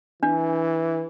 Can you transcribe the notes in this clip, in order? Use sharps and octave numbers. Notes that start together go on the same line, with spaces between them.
E3 D4